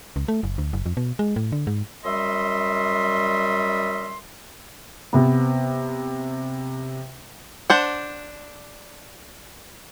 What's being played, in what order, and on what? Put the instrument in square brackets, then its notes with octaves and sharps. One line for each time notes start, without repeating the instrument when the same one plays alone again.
[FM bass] C#2
A3
F#1
D2
F#1
F2
B2
G#3
A2
D3
G#2
[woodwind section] F#2 G3 D#5 E5 C6
[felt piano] C3 B3
[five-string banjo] D4 C5 F#5